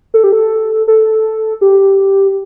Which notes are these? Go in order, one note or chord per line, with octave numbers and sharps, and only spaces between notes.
A4
G4
A4
A4
G4